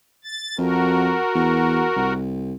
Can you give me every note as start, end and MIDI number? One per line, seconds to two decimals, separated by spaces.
0.24 0.57 93
0.58 1.16 41
0.58 2.13 66
0.58 2.13 70
1.35 1.85 40
1.96 2.54 36